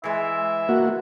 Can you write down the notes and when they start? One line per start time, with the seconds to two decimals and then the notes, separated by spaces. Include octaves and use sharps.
0.04 E3 G#3 E5
0.69 A#3 F#4